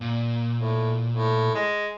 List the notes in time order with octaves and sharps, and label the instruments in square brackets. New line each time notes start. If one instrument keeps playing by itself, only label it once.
[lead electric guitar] A#2
[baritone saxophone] A2
A2
G#3